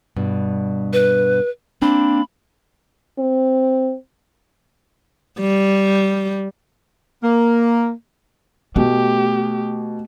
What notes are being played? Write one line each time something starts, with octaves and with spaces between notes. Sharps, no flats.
G2 B2
B4
A#3 C4 D4 B5
C4
G3
A#3
B2 A3 G4